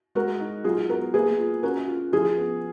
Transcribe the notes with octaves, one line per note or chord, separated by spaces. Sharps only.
G#3 F#4 A#4
D#4
F#3 F4 G#4
B3 F#4 A#4
A#3 G#4 B4
F4
C#4 F#4 A#4
F4
F3 F4 G#4
B3